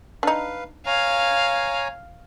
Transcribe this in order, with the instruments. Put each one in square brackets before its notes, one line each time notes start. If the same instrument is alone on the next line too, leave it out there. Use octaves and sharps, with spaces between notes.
[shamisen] D4 D#4 [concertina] B4 F5
[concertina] C#5 G#5 A#5 [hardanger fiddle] F5